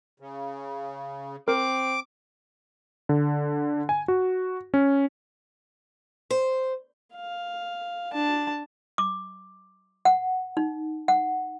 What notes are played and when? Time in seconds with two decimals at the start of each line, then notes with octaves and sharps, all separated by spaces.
0.20 C#3
1.48 C4 A#4 D6
3.09 D3
3.89 G#5
4.08 F#4
4.74 C#4
6.31 C5
7.15 F5
8.13 D4 A5
8.98 D6
10.05 F#5
10.57 D#4
11.08 F#5